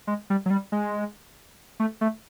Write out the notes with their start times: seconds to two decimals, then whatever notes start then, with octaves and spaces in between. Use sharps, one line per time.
0.07 G#3
0.30 G3
0.46 F#3
0.50 G3
0.72 G#3
1.80 A3
2.01 A3